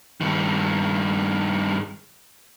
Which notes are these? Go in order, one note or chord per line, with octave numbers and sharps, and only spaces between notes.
G2 D#3